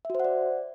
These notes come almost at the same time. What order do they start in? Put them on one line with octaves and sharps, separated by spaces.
E5 F#4 C5 F#5 D5